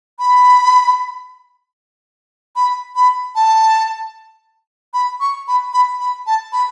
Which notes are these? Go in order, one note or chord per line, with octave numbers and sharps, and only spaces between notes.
B5
B5
B5
A5
B5
C#6
B5
B5
B5
A5
B5